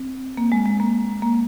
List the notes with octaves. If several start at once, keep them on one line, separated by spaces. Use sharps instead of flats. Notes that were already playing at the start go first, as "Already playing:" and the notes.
Already playing: C4
A#3
G#3
G#3
A#3
A#3